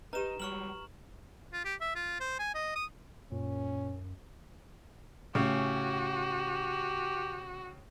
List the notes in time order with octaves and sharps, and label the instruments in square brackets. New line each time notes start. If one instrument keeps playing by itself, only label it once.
[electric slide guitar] D#4 [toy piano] G4 B4 [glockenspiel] A#5 E7
[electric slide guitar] F#3 G3 [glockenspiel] C#6 F6 F#7
[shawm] F4
G4
E5
F4
C5
G#5
D#5
D#6
[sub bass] F#2 [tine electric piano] A#2 [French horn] C#4
[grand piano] A2 C#3 [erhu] F#4 [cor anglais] G4